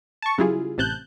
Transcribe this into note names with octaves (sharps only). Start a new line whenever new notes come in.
A5 C#6
C#3 F#3 G3 E4 F4 G#4
A1 C3 A5 F#6 G6